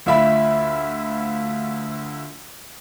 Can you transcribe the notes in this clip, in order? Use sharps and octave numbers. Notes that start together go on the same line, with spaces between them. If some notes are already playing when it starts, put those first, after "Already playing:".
D2 F4 E5 B5